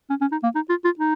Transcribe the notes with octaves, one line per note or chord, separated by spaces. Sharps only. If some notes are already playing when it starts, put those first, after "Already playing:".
C#4
C#4
D#4
A#3
D#4
F4
F4
D#4